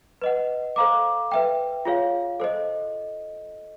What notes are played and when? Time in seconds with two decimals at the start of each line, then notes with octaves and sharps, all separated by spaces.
0.22 B4 D#5 F#5
0.76 A4 C5 F5 A#5 D6
1.31 B4 E5 G5
1.85 F4 G#4 C#5 F5
2.40 A4 C5 D#5